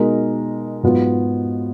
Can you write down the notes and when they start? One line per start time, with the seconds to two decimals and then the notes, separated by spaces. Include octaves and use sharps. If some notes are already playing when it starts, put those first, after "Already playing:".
Already playing: B2 G#3 D#4 A#4
0.83 G#2 F#3 B3 F4